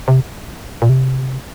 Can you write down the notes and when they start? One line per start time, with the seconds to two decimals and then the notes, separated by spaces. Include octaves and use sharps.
0.08 C3
0.82 A#2
0.89 C3